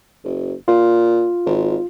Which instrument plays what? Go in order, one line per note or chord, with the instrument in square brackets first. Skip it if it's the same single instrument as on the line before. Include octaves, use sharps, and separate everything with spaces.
[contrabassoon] F#1
[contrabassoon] A#2 [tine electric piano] F4
[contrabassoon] G#1